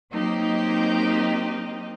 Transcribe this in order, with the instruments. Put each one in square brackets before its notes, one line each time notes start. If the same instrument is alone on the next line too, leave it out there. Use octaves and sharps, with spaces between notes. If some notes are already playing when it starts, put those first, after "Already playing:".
[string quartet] F#3 A#3 C4 D#4 G4 D#5